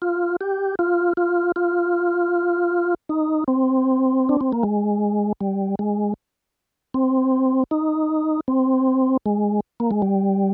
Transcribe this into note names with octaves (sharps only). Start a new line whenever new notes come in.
F4
G4
F4
F4
F4
D#4
C4
D4
C4
A#3
G#3
G3
G#3
C4
D#4
C4
G#3
A#3
G#3
G3